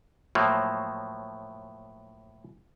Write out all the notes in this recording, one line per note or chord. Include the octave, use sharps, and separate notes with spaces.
A2 F3 F#3 A#3